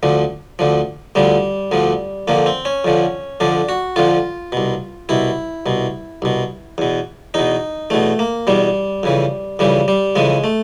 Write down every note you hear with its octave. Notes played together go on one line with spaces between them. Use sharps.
D2 D3 F3
D2 D3 F3
D2 D3 F3 G3
D2 D3 F3
F2 D3 F3 A#3
C4
C#4
F2 D3 F3
F2 D3 F3 D4
F#4
F2 D3 F3 F4
C2 B2
C2 B2 E4
C2 B2
C2 B2
E2 B2
E2 B2 D#4
E2 B2 A3
A#3
E2 B2 G3
F2 C#3 E3
F2 C#3 E3 G3
G3
F2 C#3 E3 G#3
A3